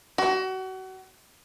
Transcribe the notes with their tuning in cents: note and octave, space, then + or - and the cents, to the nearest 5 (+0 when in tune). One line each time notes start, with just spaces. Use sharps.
F#4 +30